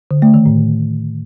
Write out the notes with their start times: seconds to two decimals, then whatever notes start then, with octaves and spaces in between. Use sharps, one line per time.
0.11 D3
0.22 A3
0.34 D#3
0.46 A2